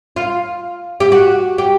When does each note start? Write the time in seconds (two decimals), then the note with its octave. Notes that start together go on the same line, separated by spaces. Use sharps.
0.16 F4
1.00 G4
1.12 F#4
1.58 G4